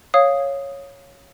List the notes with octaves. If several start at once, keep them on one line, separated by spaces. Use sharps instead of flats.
C#5 F5 D#6